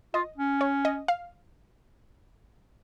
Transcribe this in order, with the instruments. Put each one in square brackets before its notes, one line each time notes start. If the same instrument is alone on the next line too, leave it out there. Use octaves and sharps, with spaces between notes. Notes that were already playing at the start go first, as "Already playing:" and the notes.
[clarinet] F4 [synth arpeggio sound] D#5
[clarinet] C#4
[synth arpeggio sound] C#5
D#5
F5